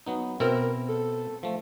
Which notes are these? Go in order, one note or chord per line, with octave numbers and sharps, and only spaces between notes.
F#3 B3 D#4
B2 C4 E4 A#4
A4
F3 A3